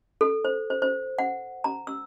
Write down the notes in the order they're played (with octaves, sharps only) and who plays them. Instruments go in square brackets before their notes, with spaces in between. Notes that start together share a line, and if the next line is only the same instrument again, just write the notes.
[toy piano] A4
C5
C5
C5
F#5
A#5
E6